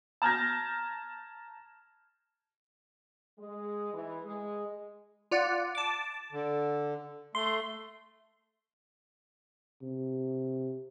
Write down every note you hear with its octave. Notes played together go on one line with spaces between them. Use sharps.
A5 A#5 F6 G6 G#6 A#6
G#3
E3
G#3
F4 D5 F#5
A5 D6
D3
A3 C6
C3